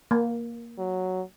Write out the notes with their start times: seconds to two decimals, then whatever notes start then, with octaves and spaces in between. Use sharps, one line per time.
0.11 A#3
0.79 F#3